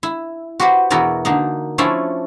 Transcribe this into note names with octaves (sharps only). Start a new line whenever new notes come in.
E4
F#4 G4 B4 C5 D5
E2 B2 E4 F#4 A#4 D5
D3 A#3 D#4
F3 A3 C#4 D4 E4